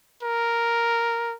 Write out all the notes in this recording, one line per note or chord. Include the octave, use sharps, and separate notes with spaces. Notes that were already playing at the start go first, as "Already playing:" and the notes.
A#4